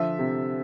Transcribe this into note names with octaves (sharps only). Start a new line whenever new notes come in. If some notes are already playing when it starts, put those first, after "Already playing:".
Already playing: D3 F3 E5
C3